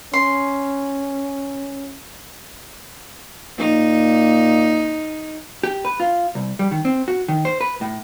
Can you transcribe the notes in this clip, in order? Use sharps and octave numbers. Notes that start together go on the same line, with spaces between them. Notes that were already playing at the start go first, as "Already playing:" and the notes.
C#4 C6
A#2 D#4
G4
B4
F4
C2
G3
D#3
C4
F#4
D#3
C5
B4
A2